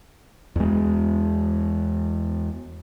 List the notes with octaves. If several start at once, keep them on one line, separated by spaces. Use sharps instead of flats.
E2 G#3